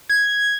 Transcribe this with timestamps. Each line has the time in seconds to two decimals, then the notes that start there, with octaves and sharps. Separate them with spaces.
0.09 G#6